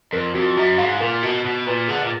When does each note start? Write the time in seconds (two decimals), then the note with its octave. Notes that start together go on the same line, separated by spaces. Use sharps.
0.13 F2 A#4
0.35 F2 F#4
0.57 F#2 F#4
0.78 G#2 F5
1.01 A#2 A#4
1.23 B2 F#4
1.44 B2 F#4
1.66 A#2 B4
1.88 D3 G#4
2.04 A#2